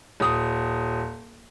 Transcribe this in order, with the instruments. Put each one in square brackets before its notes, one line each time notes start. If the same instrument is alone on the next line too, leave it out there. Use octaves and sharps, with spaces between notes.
[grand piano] D#1 D#6